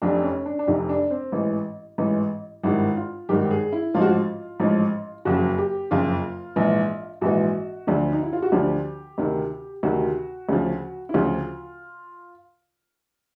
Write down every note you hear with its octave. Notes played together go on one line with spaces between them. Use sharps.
F1 F2 C3 D4
C#4
D4
D4
F1 F2 C3 D#4
D4
C4
A1 G#2 E3
A1 G#2 E3
G#1 G2 D#3 E4
F4
G#1 G2 D#3 G4
G#4
E4
A1 G#2 F3 F4
F#4
F4
A1 G#2 F3
F#1 F2 C#3 F#4
G4
F#1 F2 C#3 F4
A#1 G#2 E3
A#1 G#2 E3 F#4
D2 D3 F3
D#4
E4
F4
F#4
D2 D3 F3 G4
D2 C3 D#3
D2 C3 D#3 F#4
D2 C#3 F3
E4
D2 C#3 F3 F4